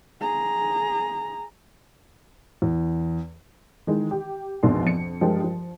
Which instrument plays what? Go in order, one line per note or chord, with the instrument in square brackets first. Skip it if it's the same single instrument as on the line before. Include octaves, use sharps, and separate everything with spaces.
[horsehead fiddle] G#4 A#5
[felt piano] E2
[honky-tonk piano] D#3 E3 G#3
G4
A#1 F2 G#2 B2 D5 C6
F2 C#7
G2 F3 G#3 A#4 G5
F3